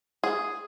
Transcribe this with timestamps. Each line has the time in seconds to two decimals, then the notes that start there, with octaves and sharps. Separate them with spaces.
0.24 G#4